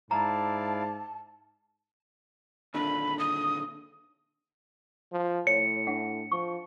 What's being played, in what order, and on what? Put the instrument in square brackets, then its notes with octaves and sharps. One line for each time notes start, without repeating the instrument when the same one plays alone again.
[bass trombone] G#2 [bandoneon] E4 D5 F5 [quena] A5 [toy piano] A#5
[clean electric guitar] A#2 D3 D#3 [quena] B5
[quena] D#6
[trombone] F3
[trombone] A2 [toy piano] C#5 [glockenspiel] C#7
[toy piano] D4 E5 F#5
[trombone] F3 [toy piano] C#6